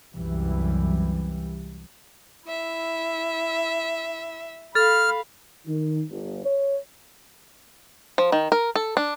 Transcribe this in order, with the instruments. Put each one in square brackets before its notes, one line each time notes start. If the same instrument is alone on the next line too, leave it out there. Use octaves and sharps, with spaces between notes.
[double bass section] C2 F#2 E3 G3
[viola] E4 [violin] E5
[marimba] A4 [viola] F5 B5 [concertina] F6
[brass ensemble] D#3
G1
C#5
[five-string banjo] F3
D#3
A#4
A4
D4